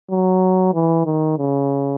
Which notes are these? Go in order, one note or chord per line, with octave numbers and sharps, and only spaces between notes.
F#3
E3
D#3
C#3